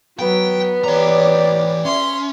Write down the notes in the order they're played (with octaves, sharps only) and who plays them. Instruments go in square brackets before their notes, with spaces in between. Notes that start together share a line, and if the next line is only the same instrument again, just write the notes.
[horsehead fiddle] F#3 [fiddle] B3 [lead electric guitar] G5
[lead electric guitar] E3 A#5 [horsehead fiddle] G4 D5 [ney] C#5
[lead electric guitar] C#4 [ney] E5 [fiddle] C6